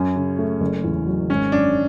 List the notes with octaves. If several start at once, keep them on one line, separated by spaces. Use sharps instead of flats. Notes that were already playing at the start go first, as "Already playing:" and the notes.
Already playing: F#2 C#4
C#3
A3
F#1
E2
F#3
G#1 C#4
F#2 D4